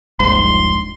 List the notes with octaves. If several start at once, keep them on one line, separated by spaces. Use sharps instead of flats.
D#1 A#1 G#2 C6